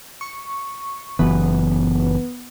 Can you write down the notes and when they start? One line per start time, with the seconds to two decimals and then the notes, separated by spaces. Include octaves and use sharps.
0.21 C#6
1.19 F#1 E3 B3